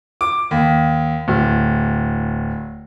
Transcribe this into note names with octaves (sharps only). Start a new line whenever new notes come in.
D6
D#2
D1